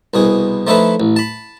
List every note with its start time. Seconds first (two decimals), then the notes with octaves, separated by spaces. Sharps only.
0.14 C2 B2 G#4
0.67 F3 A3 D#4 E4 A4 B4
1.00 A1
1.16 A5 B5